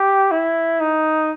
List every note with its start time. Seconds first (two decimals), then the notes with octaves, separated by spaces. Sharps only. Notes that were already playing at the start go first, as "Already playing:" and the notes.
Already playing: G4
0.31 E4
0.80 D#4